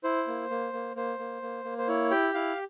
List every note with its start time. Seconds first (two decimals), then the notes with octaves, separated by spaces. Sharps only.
0.04 E4 C5
0.27 A#3
0.51 A#3
0.73 A#3
0.96 A#3 C5
1.19 A#3
1.42 A#3
1.65 A#3
1.78 C5
1.88 E4 C#5
2.11 G4 G5
2.34 E4 F5